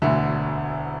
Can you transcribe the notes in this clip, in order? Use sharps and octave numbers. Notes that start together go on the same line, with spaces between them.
E1 D2 D3 E5